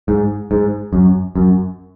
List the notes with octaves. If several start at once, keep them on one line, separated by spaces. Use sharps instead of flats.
G#2
G#2
F#2
F#2